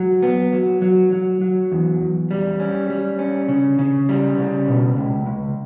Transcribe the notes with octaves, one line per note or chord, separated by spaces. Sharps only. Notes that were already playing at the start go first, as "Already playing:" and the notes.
Already playing: F#3
B3
F#3
F#3
F#3
F#3
E2
E2
G3
C#4
G3
C#4
C#3
C#3
G3
C#3
B2
C#2
C#2